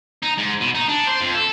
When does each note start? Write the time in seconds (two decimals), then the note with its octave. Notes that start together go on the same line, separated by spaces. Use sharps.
0.23 D#4
0.38 G#2
0.61 B2
0.75 D#4
0.89 D4
1.07 C5
1.21 F2
1.35 A4